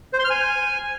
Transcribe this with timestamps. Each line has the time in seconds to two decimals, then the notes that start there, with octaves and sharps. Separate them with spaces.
0.13 C5
0.19 C6
0.24 F6
0.30 G#5